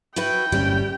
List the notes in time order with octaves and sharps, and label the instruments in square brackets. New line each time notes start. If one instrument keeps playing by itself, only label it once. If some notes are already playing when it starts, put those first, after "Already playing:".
[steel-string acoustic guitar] E4 F#4 B4 [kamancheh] G5
[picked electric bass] G1 C3 C#4 [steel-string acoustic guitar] G3